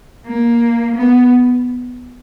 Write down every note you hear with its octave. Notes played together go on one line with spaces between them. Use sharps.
A#3
B3